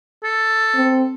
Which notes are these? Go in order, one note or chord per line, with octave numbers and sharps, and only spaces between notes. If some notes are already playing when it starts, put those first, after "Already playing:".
A4
C4